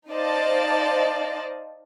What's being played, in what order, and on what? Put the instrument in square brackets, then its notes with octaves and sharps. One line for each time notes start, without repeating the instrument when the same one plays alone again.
[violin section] D#4 C5 D5 D#5 F5 A5